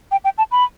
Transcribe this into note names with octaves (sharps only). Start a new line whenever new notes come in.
G5
G5
A5
B5